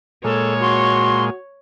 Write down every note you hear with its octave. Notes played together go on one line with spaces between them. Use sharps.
A#2 G#3 A4 C#5
F#4 C6